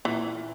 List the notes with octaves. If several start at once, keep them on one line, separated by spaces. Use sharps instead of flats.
A#2 E3